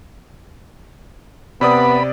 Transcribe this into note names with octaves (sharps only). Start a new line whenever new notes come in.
C3 B3 D5 B5 D#6